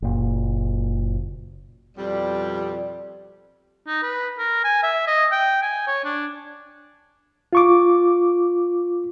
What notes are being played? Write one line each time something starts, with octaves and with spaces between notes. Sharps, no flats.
F#1 A#2
F2 B2 G3
D#4
B4
A#4
G#5
E5
D#5
G5
G#5
C#5
D4
F4 C#6 D6